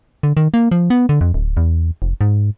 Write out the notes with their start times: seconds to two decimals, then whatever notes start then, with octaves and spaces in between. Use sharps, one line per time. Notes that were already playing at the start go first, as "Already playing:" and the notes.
0.23 D3
0.37 D#3
0.54 A#3
0.71 F3
0.90 B3
1.09 D3
1.21 F2
1.34 D1
1.57 E2
2.02 F1
2.21 G#2